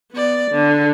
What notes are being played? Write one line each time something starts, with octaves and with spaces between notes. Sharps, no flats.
B3 D5
D3